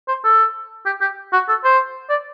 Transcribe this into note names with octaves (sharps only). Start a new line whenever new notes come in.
C5
A4
G4
G4
F#4
A4
C5
D5